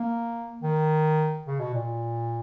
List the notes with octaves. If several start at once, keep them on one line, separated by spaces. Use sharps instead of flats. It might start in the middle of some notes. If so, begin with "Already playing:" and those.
Already playing: A#3
D#3
C#3
B2
A#2